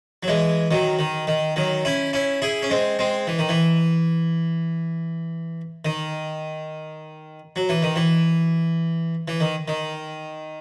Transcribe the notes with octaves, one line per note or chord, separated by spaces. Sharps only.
F#3
E3 G#3
D#3 F#3
D#3
D#3
D#3 F#3
C#4 E4
C#4 E4
E4 G#4
C#4
G#3 C4
G#3 C4
E3
D#3
E3
D#3
F#3
E3
D#3
E3
E3
D#3
D#3